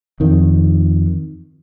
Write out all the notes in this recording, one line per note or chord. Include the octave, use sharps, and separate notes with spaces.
F2 D#3